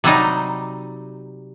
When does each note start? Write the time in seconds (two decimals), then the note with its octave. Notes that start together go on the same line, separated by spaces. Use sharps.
0.04 C3 F#3 G3 D#4